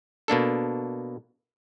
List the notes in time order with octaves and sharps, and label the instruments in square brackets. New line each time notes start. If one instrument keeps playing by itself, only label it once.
[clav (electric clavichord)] B2 A#3 D4 A4